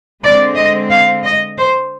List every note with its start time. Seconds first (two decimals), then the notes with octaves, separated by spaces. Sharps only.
0.23 D3 G#3 C4 D5
0.57 D#5
0.90 F5
1.24 D#5
1.59 C5